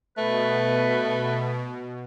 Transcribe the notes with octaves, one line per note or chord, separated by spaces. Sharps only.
B2 A3 B4